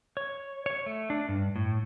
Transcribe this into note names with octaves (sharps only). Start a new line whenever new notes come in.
C#5
C#5
A3
D4
G2
A2